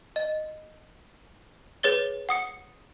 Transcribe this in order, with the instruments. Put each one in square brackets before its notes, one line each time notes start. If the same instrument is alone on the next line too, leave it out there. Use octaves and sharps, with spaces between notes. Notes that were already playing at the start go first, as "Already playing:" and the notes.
[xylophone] D#5
G#4 B4 C#5 A6 G7
F#5 D#6 C#7